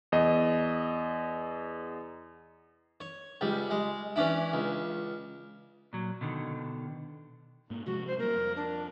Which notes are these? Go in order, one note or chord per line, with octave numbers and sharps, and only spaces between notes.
E2 D#5
C#5
C#2 G3
G#3
E3 C#4 D4 E4
C#2
A#2 F#3
B2 D3 D#3
G#2 A#3
C3 F3 G#3 F#4
C5
G3 A3 A#3 A#4
F2
D4